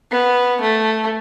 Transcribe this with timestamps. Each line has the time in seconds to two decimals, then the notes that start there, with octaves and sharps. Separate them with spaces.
0.11 B3
0.61 A3